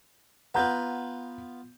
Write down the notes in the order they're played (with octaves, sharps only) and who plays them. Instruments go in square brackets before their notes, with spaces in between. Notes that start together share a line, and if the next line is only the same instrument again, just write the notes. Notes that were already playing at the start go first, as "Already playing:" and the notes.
[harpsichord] B3 F4 B4 [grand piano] F#5 A#5 G6